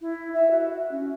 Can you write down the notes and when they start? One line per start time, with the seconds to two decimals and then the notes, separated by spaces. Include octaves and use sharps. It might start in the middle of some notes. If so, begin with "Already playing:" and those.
0.01 E4
0.34 E5
0.51 F#4
0.91 C#4